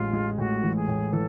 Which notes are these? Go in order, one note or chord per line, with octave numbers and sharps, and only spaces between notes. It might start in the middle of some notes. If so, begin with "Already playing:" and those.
Already playing: A1 G#3 F4
G#3
A2 F#4
E3
G#4
A2
E3 A4